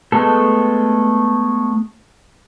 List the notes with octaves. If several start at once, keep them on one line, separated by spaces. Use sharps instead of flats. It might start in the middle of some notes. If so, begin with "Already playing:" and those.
G#3 A3 B3 A4